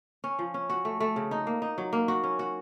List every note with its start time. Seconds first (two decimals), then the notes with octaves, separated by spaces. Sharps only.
0.24 C#4
0.39 F3
0.54 C#4
0.70 F#4
0.85 A3
1.00 A3
1.16 C#3
1.31 D#4
1.47 A#3
1.62 D#4
1.78 F#3
1.93 A#3
2.08 F#4
2.24 C#4
2.39 F#4